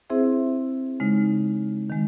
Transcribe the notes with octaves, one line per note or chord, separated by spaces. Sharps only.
C4 E4 G#4 C5 E5
C#3 G#3 D#4
D#3 G#3